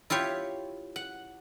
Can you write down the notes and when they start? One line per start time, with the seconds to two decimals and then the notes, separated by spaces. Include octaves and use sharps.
0.10 E4 F4 G4 C#5
0.96 F#5